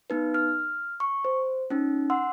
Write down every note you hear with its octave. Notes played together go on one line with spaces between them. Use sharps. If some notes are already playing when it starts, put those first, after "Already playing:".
B3 D#4 B4
F6
C#6
C5
C#4 D#4
F#5 C6 E6